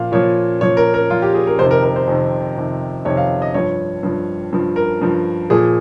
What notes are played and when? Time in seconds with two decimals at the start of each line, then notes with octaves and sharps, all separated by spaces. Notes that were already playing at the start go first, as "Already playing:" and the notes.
Already playing: A#2 F3 F5
0.12 A#2 F3 C#5
0.61 A#2 F3 C#5
0.77 A#4
0.94 A#4
1.10 A#2 F3 F4
1.22 G4
1.34 G#4
1.47 A#4
1.59 F2 C3 D#3 C5
1.71 A#4
1.84 A#4
1.96 C5
2.08 F2 C3 D#3
2.57 F2 C3 D#3
3.05 F2 C3 D#3 C#5
3.17 F5
3.42 D#5
3.54 G2 F3 C#5
4.03 G2 F3
4.53 G2 F3
4.76 A#4
5.01 G2 F3
5.50 A#2 F3 G#4